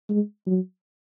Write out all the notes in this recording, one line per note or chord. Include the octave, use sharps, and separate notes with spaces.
G#3
F#3